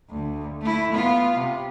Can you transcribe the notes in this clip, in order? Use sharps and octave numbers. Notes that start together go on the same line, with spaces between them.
D2
A3 E4
B3 F4
C3